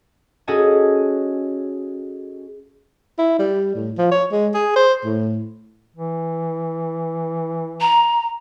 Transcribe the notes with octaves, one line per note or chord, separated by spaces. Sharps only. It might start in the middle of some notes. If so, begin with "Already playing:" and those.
C#4 F#4 G#4 A4 D#5 G#5
E4
G3
A2
F3
C#5
G#3
G#4
C5
A2
E3
A#5